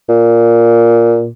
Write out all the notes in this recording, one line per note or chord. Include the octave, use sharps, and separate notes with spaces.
A#2